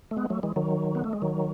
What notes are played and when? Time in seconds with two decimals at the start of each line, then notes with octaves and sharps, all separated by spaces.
0.11 A3
0.17 G#3 B3
0.30 F#3 A3
0.43 E3 G#3
0.56 D#3 F#3
0.95 B3
1.04 A3
1.13 G#3
1.22 D#3 F#3